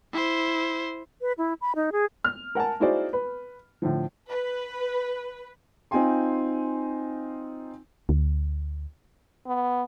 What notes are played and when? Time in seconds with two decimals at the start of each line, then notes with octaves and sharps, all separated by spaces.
0.12 E4 C5
1.21 B4
1.38 E4
1.61 B5
1.76 D#4
1.92 G#4
2.24 F6
2.55 A#4 F#5 G#5 A5
2.80 D#4 E4 F#4 G#4 C5 D5
3.13 B4
3.82 A2 D3 F3
4.30 B4
5.91 C4 D#4 F4 G5 G#5 C6
8.09 D2
9.47 B3